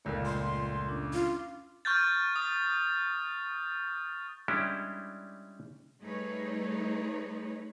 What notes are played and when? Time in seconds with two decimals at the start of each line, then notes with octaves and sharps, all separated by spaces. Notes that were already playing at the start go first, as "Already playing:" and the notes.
0.05 F1 C#2 A#2 G#3 A#4
0.26 C6
0.88 C#4 D4 D6
1.13 F4
1.85 C#6 F6 G6 A6
2.36 D#6
4.48 G3 G#3 C#4 D4 E4 G4
6.02 G3 A3 D#4 G#4 B4 C#5